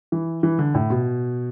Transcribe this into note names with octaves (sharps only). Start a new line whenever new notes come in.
E3
E3
D3
A2
B2